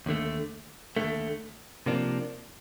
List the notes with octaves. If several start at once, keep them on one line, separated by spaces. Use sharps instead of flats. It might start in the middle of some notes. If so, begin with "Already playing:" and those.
D#2 D3 A3
D#2 D3 A3
C3 F3 A#3 D4